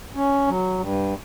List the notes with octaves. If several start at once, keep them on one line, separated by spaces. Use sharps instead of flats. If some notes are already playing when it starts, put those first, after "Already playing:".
C#4
F#3
G2